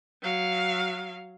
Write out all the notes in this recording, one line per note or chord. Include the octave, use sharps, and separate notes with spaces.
F#3 F5